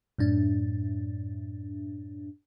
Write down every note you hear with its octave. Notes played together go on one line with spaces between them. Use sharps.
F#2 A2 D4